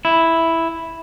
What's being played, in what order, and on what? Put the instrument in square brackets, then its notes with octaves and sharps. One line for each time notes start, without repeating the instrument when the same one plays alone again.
[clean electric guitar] E4